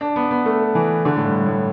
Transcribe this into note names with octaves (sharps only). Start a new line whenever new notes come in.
D4
B3
B3
A3
E3
D3
A2
G2
A2